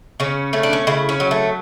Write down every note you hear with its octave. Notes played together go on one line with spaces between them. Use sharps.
C#3 C#4
A3 C#4
D4
C#4
C#3 E4
C#4
F#3
A3